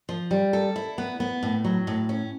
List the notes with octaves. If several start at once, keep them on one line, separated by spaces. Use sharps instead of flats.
F3
G3
A4
E4
B3
B3
A2
F#3
A2
C#4